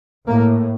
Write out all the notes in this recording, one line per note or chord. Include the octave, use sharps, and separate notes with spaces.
A2 A#3